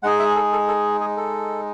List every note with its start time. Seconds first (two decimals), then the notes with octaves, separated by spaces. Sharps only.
0.03 G#3 D#4 G#4 F#5
0.19 E5
0.35 A4
0.52 A4
0.68 A4
1.01 G#4
1.17 A4